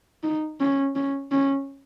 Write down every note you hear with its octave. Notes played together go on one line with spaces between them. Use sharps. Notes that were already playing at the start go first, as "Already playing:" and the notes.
D#4
C#4
C#4
C#4